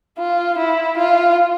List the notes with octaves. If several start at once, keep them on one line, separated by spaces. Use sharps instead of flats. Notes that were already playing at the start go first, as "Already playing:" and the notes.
F4
E4
F4